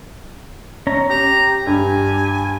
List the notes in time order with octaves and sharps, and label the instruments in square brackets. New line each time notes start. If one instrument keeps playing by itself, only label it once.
[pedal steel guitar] C#4 A#5
[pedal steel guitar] G4 [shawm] A#5
[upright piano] G2 [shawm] G#5